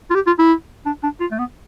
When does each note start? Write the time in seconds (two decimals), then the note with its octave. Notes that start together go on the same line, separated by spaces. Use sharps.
0.10 F4
0.15 G4
0.27 F4
0.39 E4
0.86 D4
1.03 D4
1.20 F4
1.31 A3
1.39 B3